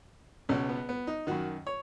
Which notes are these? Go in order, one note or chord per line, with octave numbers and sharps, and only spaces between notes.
C#2 B2 C#4
B3
B3
D#4
F#2 D#3 F#4
C#5